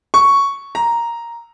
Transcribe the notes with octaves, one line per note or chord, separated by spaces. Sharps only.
C#6
A#5